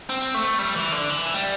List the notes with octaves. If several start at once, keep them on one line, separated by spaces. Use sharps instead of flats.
C4
A3
G3
E3
D3
E3
G3